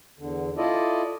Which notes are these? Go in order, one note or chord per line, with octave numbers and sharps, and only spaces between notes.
E2 D3
E4 F4 A4 D5 D#5